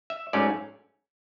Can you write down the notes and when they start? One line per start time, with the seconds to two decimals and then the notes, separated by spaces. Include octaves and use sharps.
0.10 E5
0.33 G#2 F#3 A3 C#4 D5